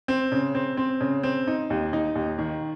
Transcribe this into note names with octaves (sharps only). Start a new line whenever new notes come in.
C4
C#3
C4
C4
C#3
C4
D#4
D#2
D#4
D#2
D#3